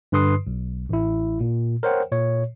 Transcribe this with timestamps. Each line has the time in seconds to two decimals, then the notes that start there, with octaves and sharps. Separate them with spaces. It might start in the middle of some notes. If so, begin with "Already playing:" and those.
0.12 G2 D3 B4 C6 D#6 C7
0.47 B1
0.89 A1 E4
1.41 A#2
1.83 A#4 C5 C#5 F#5 G5
2.11 A#2 C#5